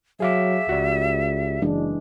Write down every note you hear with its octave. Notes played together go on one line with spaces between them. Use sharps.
F#3 G#4 E5 F5 D6
C#2 F#4 G4 D5
F#1 E3 G#3 D4